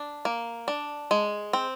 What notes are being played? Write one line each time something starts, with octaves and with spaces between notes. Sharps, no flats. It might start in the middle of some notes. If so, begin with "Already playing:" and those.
Already playing: D4
A#3
D4
G#3
C4